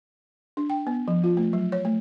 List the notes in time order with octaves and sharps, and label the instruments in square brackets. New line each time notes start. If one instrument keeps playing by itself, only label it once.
[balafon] D4
G5
B3
F3
F4
A3
F#3
C#5
A3